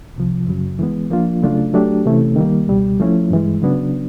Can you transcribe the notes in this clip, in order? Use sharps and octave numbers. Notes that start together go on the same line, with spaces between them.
C2 C3 F3
F#2 C#3 F#3
E3 G#3 B3
F3 A#3 D4 F4
C#3 F#3 A3 D4 F4
F#3 A3 D4 G4
C3 E3 A3 C#4 E4
D#3 G3 A#3
C#2 B2 G3
F3 A3 C#4 E4
G2 E3 G#3
C#3 F#3 B3 D4